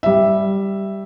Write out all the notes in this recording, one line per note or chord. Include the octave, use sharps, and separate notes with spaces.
G3 E5